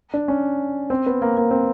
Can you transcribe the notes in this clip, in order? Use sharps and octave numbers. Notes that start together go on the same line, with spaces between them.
D4
C#4
C4
B3
A#3
A#3
C4